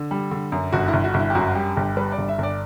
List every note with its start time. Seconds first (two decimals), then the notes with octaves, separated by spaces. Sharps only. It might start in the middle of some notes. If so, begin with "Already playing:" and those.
Already playing: D3
0.11 G3
0.31 D3
0.52 F#2
0.72 G1 F#4
0.88 G1 E4
1.04 F#4
1.14 G1
1.19 E4
1.30 G4
1.35 F#2 F#4
1.55 G3 G4
1.76 G1 G4
1.97 G3 B4
2.12 D5
2.18 G1
2.29 E5
2.38 G1
2.43 D5